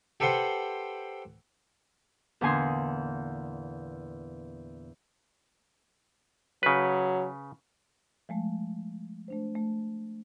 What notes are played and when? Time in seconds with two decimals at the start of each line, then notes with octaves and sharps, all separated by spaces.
0.20 G4 A4 B4 C5 F#5 G5
2.41 E2 A#2 D3 G#5 C6 D#6
6.63 C#3 F#3 B4
8.29 F3 G#3 A3
9.28 A3 D4 C5
9.55 A3